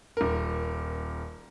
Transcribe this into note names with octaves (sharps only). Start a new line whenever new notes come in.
D#1 A#4